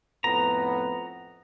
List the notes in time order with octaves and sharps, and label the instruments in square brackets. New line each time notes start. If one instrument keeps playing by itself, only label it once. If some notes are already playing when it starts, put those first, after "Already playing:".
[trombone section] F2 A2 B3 [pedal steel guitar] A#5